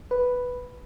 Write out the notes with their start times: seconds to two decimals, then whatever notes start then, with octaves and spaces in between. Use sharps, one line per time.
0.11 B4